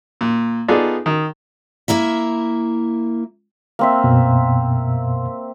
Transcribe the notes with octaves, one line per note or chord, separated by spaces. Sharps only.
A#2
B3 D#4 F4 G#4 A4 D5
D#3
A#3 E4 A#4 E5
A#3 C4 E5
F#2 B2